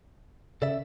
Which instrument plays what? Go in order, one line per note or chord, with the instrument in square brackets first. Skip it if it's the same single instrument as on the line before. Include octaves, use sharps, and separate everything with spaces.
[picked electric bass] C#3 [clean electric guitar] A4 D5 E5